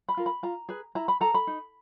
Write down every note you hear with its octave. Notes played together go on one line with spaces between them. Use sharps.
B5
F4 A#4
B5
F4 A#5
G#4 B4
E4 A#5
B5
A4 A#5
B5
D#4